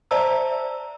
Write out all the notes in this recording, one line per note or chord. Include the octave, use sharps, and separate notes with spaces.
C5 D5 E5 A5 A#5 E6